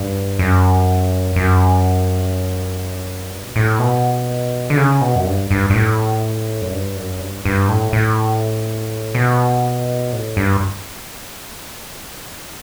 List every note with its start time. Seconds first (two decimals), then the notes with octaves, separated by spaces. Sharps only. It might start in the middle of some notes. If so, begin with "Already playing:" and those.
Already playing: G2
0.39 F#2
1.36 F#2
3.31 G2
3.43 B2
3.56 A2
3.79 B2
4.70 D3
4.77 C#3
5.01 B2
5.16 F#2
5.26 G2
5.51 G2
5.70 G2
5.74 A2
6.62 F#2
6.72 G2
6.96 F#2
7.20 G2
7.45 G2
7.69 A2
7.93 A2
9.15 B2
10.12 A2
10.37 G2